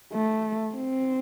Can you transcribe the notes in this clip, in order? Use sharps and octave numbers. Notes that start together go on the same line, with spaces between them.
A3
C4